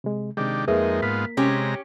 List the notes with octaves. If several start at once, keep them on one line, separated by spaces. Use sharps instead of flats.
C3 G#3
C3 D#3 G#3 D4 G4
F2 G#3 A#3 D#4 G#4 A#4 B4 E5
G#2 B3 F4 B6
C3 G#3 C#4 G4 A#5